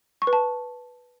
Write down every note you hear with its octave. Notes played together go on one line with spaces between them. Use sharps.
C#6
B4
A5